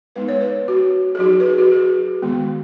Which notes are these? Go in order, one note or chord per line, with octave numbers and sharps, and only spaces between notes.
G#3 B3 D#4 B4
C#5
B4
F#4
G#4
F#3 D#4 F#4
B4
G#4
F#4
G#4
D#3 G#3 B3